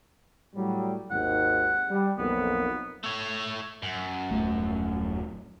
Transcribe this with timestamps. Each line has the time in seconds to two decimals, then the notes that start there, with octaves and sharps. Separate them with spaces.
0.55 A2 F#3 G3
1.11 G#1 D#2 G#2 F#5
1.89 G3
2.18 B1 F2 A#3 B3
3.04 A3 C#5
3.82 F#2
4.31 D#1 C2 A3